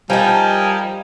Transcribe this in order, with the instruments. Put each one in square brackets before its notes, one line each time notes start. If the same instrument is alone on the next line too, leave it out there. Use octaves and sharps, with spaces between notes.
[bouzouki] F3 D#4 [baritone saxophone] G3 [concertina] A#4 G#5